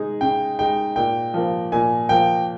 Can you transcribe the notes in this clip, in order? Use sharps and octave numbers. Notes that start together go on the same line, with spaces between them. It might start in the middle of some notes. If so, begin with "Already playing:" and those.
Already playing: G#3 D#4 G#4
C#3 G5
G#3 D#4 G#4 G5
A#2 G5
F3 A#3
A#2 G#5
F3 A#3 G5